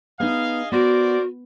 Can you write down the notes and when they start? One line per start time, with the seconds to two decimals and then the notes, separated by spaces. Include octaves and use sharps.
0.20 B3 D#4 G#4 D#5 F5
0.72 B3 F#4 A#4 C5 D5